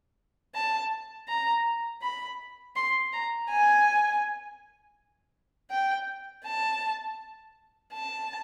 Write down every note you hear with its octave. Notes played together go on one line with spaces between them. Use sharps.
A5
A#5
B5
C6
A#5
G#5
G5
A5
A5